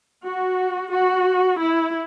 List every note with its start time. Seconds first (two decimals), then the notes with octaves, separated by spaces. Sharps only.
0.25 F#4
0.92 F#4
1.59 E4